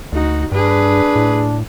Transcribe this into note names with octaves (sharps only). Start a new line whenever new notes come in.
D2 D#4 F#4
G2 D4 G#4 B4
A2